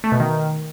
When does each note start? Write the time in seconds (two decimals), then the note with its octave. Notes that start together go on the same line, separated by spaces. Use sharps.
0.04 A3
0.12 B2
0.20 D#3